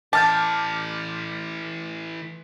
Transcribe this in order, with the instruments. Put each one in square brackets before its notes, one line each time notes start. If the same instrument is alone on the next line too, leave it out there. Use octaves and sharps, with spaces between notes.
[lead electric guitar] E3 A4 [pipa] A5 [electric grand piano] D6 F6 G6